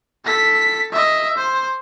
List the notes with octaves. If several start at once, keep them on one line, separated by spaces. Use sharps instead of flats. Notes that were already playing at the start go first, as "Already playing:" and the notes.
A4 B6
D#5 E5
C5